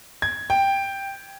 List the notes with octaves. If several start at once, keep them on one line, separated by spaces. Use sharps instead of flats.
G#6
G5